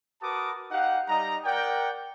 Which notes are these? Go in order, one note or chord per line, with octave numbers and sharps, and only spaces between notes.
F#4 A#4 B4 A5 D6 D#6
D#4 G4 F5 F#5
G3 D#4 D#5 A#5
A#4 D5 F#5 G5